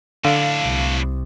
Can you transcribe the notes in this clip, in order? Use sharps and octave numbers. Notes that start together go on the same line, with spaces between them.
A2 D3 D4 F5
C2